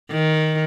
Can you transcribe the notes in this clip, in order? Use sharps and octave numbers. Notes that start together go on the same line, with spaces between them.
D#3